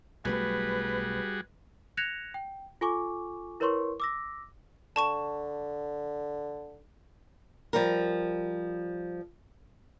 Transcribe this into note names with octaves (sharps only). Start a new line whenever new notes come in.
B1 F#3 G3 A3 F#4 G#4 B4
F#6 G#6 A#6 C#7 E7 F7
G5
F4 A4 G#5 C#6 D6
E4 A#4 B4 C#5 C6 C#6
D6 E6 A#6
D3 A5 C#6 E7
F3 G3 A#4